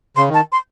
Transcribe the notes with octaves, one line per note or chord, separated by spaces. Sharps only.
C#3 C6
D#3
A5
C6